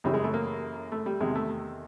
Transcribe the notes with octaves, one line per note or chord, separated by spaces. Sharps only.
F#2 C#3 E3 G3
G#3
A3
A#3
A3
G3
E2 C3 D#3 G#3
A3